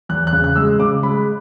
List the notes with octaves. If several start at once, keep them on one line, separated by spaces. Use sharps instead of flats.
E2 F#6
F#6
C#3
F#6
G#3 E6
C#3 D6
G#3 B5